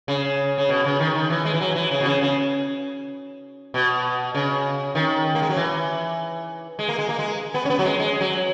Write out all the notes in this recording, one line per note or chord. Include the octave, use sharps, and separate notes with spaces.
C#3
C#3
B2
C#3
D#3
D#3
E3
G#3
E3
F#3
E3
C#3
B2
C#3
C#3
B2
C#3
D#3
A#3
G#3
F#3
E3
G#3
A#3
G#3
A#3
G#3
B3
C#4
B3
F#3
G#3
G#3
F#3